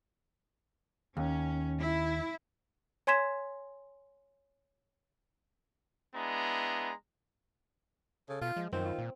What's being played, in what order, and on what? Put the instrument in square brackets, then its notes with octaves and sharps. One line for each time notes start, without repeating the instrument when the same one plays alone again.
[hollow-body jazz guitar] D#2 [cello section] C#4
[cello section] E4
[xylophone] C#5 G#5 C6 G#6 B6 E7
[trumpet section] G#3 B3 D4 E4 A#5
[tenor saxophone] C#3 [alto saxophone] A4
[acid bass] B2 [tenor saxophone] F4
[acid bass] F3 [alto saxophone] G#3
[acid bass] F#2 [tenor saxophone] D#3 [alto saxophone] F3 [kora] C4
[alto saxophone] F4
[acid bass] A#2